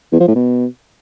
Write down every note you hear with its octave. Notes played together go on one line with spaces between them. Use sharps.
E2
F3
A2
B2